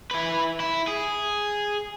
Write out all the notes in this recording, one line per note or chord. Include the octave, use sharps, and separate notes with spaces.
E4 B4
E4
G#4